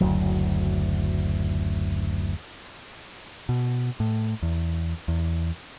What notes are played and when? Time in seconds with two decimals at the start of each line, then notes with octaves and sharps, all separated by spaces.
0.01 F#1 D2 F#3
3.49 B2
4.00 A2
4.42 E2
5.08 E2